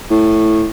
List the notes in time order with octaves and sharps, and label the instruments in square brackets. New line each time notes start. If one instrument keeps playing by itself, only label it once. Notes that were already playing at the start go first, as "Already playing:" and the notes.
[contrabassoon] A2